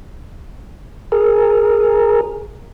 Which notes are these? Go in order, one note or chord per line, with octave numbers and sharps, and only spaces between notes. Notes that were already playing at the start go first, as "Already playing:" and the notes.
G#4 A#4